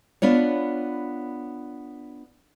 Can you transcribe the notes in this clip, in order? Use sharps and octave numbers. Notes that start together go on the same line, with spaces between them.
B3 D4 F4 C#5